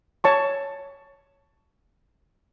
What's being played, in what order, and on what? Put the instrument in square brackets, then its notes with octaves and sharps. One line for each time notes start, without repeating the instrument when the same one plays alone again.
[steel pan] C#5 A5 C#6